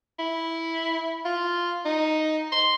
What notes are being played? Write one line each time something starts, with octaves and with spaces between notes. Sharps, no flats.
E4
F4
D#4
C6